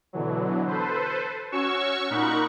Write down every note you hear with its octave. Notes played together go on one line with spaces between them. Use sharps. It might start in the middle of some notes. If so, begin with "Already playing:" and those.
B2 D3 E3 F#3
A4 B4 C5
C#4 F#4 C#5 C#6 E6
A#2 D#4 A#4 F#5 B5 C#6